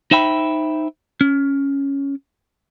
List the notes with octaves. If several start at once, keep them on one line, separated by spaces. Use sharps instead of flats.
D#4 C5 E5 G5 B5
C#4